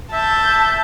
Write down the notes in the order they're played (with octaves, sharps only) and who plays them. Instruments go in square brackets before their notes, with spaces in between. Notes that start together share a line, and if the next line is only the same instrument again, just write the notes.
[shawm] E5 [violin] A5 G6